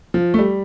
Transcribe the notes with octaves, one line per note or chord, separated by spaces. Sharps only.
F3
A3
G3